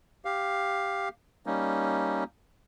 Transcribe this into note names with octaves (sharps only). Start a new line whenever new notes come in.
G4 F5
G3 A#3 C#4 D#4